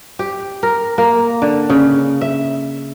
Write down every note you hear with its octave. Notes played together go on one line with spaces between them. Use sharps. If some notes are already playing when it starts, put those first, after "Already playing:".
G4
A#4
A#3
D3
C#3
E5